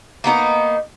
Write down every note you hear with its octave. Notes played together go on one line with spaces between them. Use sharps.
A#3 B3 D#4